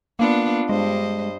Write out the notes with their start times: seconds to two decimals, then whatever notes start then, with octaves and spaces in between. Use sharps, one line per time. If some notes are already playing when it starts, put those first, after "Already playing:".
0.19 A#3 B3 D4 F4
0.69 G2 G#3 C5 D#5